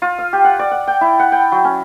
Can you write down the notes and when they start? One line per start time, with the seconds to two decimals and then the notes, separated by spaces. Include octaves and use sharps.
0.02 F4
0.18 F5
0.33 G4
0.44 F#5
0.59 D5
0.71 F#5
0.87 G5
1.01 E4
1.20 F#5
1.32 G5
1.52 F#3
1.65 C#4